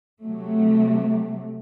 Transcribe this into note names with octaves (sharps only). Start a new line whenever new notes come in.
C3 F#3 A3